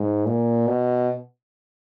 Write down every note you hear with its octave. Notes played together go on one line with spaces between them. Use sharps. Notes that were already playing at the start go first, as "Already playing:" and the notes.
Already playing: G#2
A#2
B2